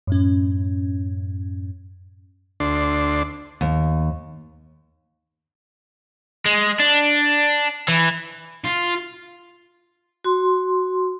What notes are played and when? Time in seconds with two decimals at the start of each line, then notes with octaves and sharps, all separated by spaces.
0.07 F#2 A2 C#4
2.60 D2 D4 C6
3.61 D#2
6.46 G#3
6.80 D4
7.88 E3
8.64 F4
10.24 F#4 C6